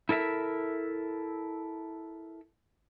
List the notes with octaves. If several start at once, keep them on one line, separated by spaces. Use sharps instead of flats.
E4 A4 A#4 E5